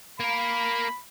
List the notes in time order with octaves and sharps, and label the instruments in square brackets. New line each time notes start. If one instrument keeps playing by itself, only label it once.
[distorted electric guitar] A#3 A#4 [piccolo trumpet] B5